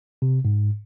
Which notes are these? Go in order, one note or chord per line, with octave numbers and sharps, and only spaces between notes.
C3
G#2